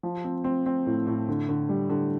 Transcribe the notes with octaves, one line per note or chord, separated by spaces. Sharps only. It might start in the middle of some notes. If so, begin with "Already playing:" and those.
F3
C4
C4
C4
A2
A2
D3
D3
G3
D3